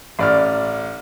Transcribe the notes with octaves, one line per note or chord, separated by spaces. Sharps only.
A1 D5 F6